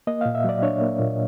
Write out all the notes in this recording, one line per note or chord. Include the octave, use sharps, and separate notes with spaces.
A#3 D#5
A#2 F5
E5
F#3 D5
D4 C#5
A#3
A#2